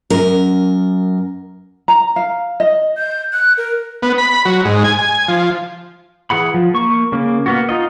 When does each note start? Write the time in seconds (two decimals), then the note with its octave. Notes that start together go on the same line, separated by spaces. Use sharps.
0.10 F#2 A#4
1.88 A#5
2.16 F5
2.60 D#5
2.97 G6
3.33 F#6
3.58 A#4
4.02 B3
4.18 B5
4.45 F#3
4.65 G#2
4.84 G#5
4.99 G#5
5.28 F3
6.30 E3 G#4 F#5 B5
6.54 F3
6.74 A#3 C#6
7.12 C#3 A#3
7.46 A#3 B3 F#4
7.69 D#4 F4 D#5